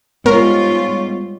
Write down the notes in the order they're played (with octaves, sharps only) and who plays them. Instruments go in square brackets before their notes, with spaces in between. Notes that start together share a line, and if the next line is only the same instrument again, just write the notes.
[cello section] G#2 G3 F4 [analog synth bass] B3 [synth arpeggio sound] A#4 [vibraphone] C#5 C#6